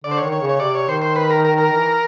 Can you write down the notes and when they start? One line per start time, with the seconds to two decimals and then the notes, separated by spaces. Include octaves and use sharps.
0.04 D3 D5
0.11 C5
0.18 C#5
0.23 D#3
0.32 C#5
0.42 C#3
0.49 C#5
0.60 C3 D5
0.75 C#5
0.88 D#3 C5
1.02 C5
1.16 B4
1.30 A#4
1.45 A#4
1.58 A#4
1.72 E3